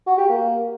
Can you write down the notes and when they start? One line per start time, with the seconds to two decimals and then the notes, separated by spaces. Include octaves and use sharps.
0.07 F#4
0.18 G4
0.30 A#3